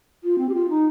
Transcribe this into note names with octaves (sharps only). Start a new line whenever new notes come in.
F4
C4
G4
F4
D#4